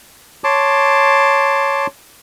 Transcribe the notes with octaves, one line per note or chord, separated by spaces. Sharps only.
C#5 A5 C6 D6